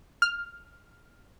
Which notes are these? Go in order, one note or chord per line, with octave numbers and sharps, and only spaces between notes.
F6